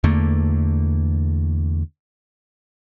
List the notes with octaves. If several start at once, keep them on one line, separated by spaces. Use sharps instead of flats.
E2 D3 A3 A#3